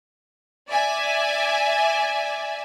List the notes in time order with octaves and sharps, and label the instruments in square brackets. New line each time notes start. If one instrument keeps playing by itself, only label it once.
[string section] D5 E5 G#5